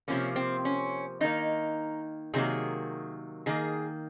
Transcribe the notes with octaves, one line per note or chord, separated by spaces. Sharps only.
C3 F3 A#3 C#4
C4
C#4
D#3 A#3 D#4
C3 D#3 F#3 A#3 G#4
D#3 A#3 G#4